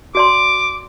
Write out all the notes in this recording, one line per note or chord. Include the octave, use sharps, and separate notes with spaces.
F#4 D5 C6 D6